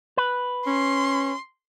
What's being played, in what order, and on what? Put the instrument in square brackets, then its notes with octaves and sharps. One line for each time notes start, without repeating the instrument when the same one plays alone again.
[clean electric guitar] B4
[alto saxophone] C#4 [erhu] C6